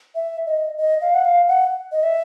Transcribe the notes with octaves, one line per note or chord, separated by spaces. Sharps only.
E5
D#5
D#5
F5
F#5
F5
F#5
D#5
E5